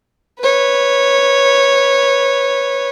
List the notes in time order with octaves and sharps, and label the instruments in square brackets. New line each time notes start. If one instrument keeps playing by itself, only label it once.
[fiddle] B4 C#5